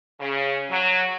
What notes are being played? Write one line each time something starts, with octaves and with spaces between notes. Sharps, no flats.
C#3
F#3